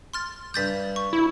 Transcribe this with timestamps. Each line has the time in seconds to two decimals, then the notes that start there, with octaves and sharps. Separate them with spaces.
0.14 C6 F6 A6
0.54 G2 D#6 G6 A6 B6
0.96 C#6
1.13 E4